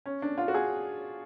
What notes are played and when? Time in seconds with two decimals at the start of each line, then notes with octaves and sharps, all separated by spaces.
0.06 C#4
0.22 D4
0.38 F4
0.48 F#4
0.54 G#4